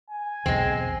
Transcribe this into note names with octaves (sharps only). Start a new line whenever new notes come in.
G#5
B1 E2 G#3 C4